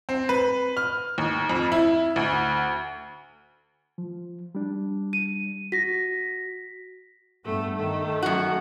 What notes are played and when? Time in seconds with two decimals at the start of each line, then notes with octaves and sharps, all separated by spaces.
0.09 C4
0.29 B4
0.77 F6
1.18 D#2
1.50 F2
1.72 E4
2.16 D2
3.98 F3
4.55 G3 D4
5.13 D#7
5.72 F#4 A#6 B6
7.45 G2 A3 B3
7.77 D#3 A3
8.22 F#2 F#4